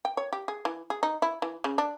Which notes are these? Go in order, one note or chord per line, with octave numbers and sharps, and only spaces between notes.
G5
C#5
G4
G#4
E3
G#4
D#4
E4
E3
C#3
D4